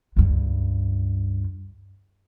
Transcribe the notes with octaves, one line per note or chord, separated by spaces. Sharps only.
C#2 G2